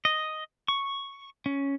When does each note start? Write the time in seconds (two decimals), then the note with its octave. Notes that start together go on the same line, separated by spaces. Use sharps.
0.05 D#5
0.68 C#6
1.46 C#4